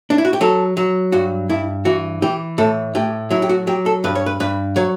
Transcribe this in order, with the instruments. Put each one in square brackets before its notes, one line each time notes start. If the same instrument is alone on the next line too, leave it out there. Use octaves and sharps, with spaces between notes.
[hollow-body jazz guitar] D4
E4
F#4
G4
F#3 A4
F#3
G2 F#4
G2 E4
E3 F#4
E3 G4
A2 A4
A2 G4
F#3 E4
G4
F#4
F#3 G4
A4
G2 B4
C#5
B4
G2 B4
F#3 C#5